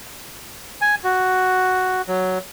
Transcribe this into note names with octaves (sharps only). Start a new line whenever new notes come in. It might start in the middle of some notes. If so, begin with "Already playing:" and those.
G#5
F#4
F#3